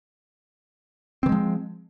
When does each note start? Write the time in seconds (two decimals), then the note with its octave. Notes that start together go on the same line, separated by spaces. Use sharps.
1.23 C4
1.26 E3
1.29 G#3
1.32 F3